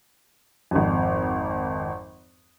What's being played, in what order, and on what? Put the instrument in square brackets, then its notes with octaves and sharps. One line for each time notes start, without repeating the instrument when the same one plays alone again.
[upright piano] G#1 F2